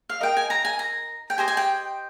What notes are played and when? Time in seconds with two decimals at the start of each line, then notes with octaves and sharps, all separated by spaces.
0.09 F5
0.21 D#4 A#4 D#5 G5
0.37 G#5
0.50 A#5
0.65 G#5
0.79 A#5
1.30 G5
1.37 G4 C5 D#5 G#5
1.48 G#5
1.57 G5